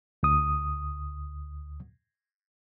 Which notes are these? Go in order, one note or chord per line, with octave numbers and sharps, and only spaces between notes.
D2 D#6